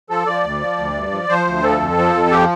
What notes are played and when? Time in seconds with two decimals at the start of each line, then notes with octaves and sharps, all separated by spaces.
0.10 F3 A4
0.26 F3 D5
0.44 D2
0.61 F3
0.78 D2
0.94 G2
1.12 F3
1.29 F3 C5
1.47 D2
1.63 F3 A4
1.80 F2
1.98 F3
2.14 F2
2.31 F3 G4